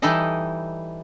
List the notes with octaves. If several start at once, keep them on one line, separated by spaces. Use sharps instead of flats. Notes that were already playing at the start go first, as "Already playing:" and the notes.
E3 G3 D#4 E4 A4 D#5